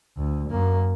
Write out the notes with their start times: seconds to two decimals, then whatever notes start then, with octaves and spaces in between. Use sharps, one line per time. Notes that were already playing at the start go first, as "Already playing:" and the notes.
0.17 D2
0.50 F#2 A#3